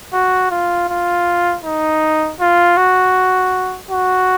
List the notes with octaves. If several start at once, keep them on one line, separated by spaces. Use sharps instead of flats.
F#4
F4
F4
D#4
F4
F#4
F#4